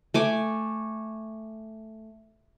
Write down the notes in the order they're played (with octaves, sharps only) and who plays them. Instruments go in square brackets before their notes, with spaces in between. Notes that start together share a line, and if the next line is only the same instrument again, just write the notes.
[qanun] A3 G#5 D6